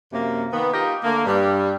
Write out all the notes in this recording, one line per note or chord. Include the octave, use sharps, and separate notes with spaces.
F#2 C3 A#3
D#3 A#3 B3
D#4 F4 G4 A#4 D#5
D3 A3 A#3
G2 G3